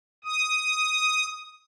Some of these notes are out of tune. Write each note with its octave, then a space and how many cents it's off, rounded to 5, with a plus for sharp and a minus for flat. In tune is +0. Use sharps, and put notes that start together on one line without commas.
D#6 +5